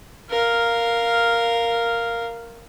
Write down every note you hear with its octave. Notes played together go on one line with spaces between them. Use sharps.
A#4 F5